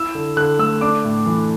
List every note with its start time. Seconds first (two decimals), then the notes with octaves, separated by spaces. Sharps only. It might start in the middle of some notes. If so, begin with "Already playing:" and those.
Already playing: E4 E6
0.15 D3
0.36 D3 F#6
0.59 A3 E6
0.81 D4 D6
1.05 A2
1.26 E3